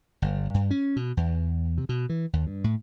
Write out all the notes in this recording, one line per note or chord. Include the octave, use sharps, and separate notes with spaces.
G1
G2
C#4
B2
E2
C3
B2
E3
D#2
G2
A2